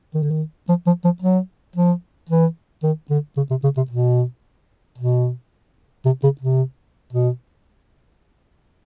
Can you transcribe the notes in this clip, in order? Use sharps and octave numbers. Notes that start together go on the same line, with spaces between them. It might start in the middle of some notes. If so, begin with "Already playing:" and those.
D#3
D3
D#3
F3
F3
F3
F#3
F3
E3
D#3
D3
C#3
C3
C#3
C3
B2
B2
C3
C#3
C3
B2